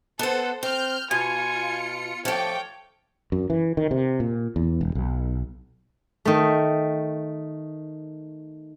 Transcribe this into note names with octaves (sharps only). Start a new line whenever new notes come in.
B3 A4 C5 F#5
C4 F6 G6
B2 F4 G#5 C#7
F3 A3 C#5 G5 D6
F#2
E3
D#3
C3
A#2
E2
E1
B1
D#3 A3